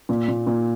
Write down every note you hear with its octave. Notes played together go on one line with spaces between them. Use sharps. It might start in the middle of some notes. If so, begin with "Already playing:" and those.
A#2
A#2
A#2